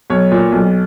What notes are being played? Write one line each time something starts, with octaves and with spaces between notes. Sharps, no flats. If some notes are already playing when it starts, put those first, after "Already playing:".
B1 C#5
A#2
B1